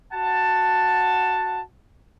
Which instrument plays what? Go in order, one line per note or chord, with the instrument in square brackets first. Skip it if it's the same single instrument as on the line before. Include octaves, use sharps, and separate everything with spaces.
[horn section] F#4 F#5 A5